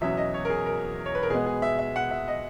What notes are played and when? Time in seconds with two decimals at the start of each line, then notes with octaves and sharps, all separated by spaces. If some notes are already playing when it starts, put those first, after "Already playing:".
0.01 E2 B2 F#3 C#4 E5
0.17 D#5
0.34 C#5
0.45 A#4
0.50 G#4
0.66 A#4
1.06 C#5
1.15 B4
1.23 A#4
1.30 B2 G#3 B3 G#4
1.46 G#4
1.62 E5
1.79 E5
1.96 F#5
2.11 E5
2.28 D#5